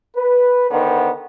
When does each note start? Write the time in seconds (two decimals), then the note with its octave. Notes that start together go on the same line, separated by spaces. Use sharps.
0.16 B4
0.71 D3 D#3 B3 C5